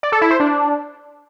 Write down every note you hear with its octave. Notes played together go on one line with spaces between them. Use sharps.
D5
A4
E4
C5
D4